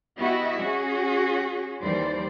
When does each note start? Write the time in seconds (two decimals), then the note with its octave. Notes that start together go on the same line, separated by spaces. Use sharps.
0.18 B3 E4 F#4 G4 D#5 E5
0.58 C#4 F#4 G#4
1.80 D#2 E3 G3 C5 D5